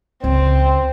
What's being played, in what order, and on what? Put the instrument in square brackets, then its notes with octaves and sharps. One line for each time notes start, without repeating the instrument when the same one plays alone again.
[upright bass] C#2 [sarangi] C4